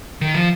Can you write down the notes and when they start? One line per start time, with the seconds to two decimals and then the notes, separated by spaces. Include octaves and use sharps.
0.21 D#3
0.34 F3